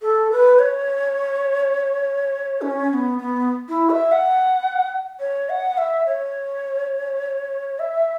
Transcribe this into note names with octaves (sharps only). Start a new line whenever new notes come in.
A4
B4
C#5
C#4
C#4
B3
B3
E4
E5
F#5
C#5
F#5
E5
C#5
E5